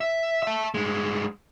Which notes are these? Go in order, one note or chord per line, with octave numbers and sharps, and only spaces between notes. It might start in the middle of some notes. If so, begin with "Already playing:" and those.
E5
E5 A5
G2 G#3